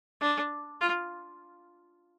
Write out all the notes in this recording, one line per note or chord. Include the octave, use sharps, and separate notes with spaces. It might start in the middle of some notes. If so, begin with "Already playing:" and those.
D4
F4